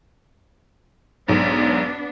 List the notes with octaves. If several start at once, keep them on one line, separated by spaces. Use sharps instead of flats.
B1 G#2 B3 D4